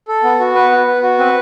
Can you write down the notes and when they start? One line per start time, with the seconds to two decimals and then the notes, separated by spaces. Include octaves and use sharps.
0.08 A4
0.23 B3
0.40 F#4
0.55 B3 B4
0.71 B3
0.87 B3
1.02 F#4
1.18 C4 B4